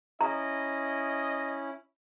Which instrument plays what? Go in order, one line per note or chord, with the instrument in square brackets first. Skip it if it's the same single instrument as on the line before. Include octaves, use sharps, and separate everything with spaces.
[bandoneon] C#4 E4 [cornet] D#5 [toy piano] A#5